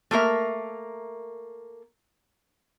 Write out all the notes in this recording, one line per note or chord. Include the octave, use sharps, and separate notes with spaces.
A3 A#3 A#4 E5